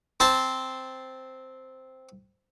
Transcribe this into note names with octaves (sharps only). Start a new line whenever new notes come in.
C4 C5 A5 C6